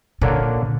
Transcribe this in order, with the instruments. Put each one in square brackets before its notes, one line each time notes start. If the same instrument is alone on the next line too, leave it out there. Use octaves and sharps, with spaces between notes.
[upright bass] A#2 [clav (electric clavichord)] D3 A#3 D4 A#4 C#5